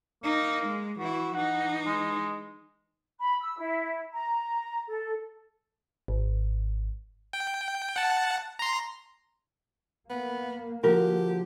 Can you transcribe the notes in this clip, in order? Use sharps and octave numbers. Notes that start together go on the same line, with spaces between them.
A#3 D#4
G#3
E3 E4 F#4
E3 D#4 F#5
G#3
B5
E6
E4
A#5
A4
G#1
G5
F#5 A5
A#5 C6
A#3 B3
D3 F3 F#4 G4 A#4